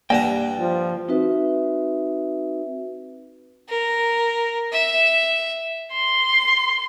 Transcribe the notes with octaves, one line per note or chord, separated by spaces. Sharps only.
G2 A#3 B4 D5 F#5 G5 A#5
F3
C4 D#4 F#4 B4 E5
A#4
E5
C6